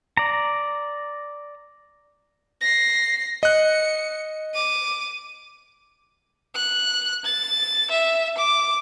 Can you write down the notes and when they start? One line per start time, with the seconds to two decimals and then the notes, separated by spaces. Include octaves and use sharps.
0.17 D5 A#5
2.61 A#6 C7
3.43 D#5 F#6 C#7
4.54 D6 D#7
6.55 F#6
7.24 A6
7.91 E5
8.37 D6